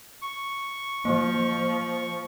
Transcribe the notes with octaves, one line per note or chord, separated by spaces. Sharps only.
C#6
F3 A#3